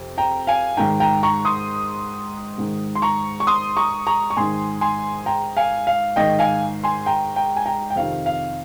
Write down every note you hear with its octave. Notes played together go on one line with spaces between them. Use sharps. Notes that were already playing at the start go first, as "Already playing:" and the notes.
Already playing: F2 C3
G5 A#5
F5 G#5
G#2 D#3 G5 A#5
G5 A#5
A#5 C#6
C6 D#6
G#2 D#3
C6
A#5 C#6
C#6
C6 D#6
A#5 C#6
A#5 C#6
C#6
G#2 D#3 G#5 C6
G#5 C6
G5 A#5
F5 G#5
F5
G#2 D#3 D#5 G5
F5 G#5
G#5 C6
G5 A#5
G5 A#5
G#5
G5 A#5
G5
F2 C3 D#3 F5
F5